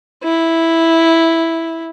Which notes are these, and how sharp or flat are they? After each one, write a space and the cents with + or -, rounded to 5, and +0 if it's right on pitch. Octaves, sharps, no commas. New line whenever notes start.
E4 -5